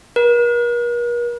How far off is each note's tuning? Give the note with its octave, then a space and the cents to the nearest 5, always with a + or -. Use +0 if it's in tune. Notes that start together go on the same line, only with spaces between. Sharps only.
A#4 +45